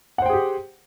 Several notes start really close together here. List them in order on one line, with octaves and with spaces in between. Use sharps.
F#5 C5 G5 G#4 G4